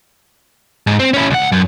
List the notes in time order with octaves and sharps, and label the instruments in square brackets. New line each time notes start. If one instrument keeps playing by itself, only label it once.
[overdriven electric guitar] G#2
C4
C#4 E4
C#2 F#5
F#2